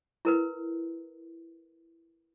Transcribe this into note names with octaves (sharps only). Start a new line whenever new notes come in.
E4 A#4 B4